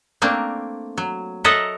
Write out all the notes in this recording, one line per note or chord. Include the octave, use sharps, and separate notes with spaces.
A3 A#3 C4 D4
F#3
A4 A#4 C#5 D#5 E5 F#5